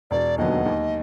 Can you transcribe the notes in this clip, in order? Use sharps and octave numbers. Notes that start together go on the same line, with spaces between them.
E1 D5
D#2 D3 F#3 B3 D#5
D#2